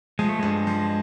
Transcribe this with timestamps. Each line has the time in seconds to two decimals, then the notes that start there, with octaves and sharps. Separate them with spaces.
0.19 F3 G#3
0.29 A3
0.39 G2 G#3
0.67 F3